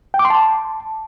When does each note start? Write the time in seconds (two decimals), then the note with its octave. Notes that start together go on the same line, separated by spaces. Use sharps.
0.14 G5
0.19 D6
0.25 C6
0.30 A5